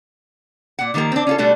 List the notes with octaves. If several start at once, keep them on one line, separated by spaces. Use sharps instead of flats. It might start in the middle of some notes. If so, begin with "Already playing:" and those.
A#2 F#5
D#3 F3 A#3 G4 A#4
C4 D4
C#4 F4 A4
B2 G3 A3 D4 F#4